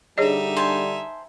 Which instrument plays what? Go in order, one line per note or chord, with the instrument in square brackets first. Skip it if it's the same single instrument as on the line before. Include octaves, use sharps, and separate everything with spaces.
[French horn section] D3 G3 D4 [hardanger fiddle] D#4 E5 [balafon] G#4 C#5 D#5
[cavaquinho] C5 G#5 A5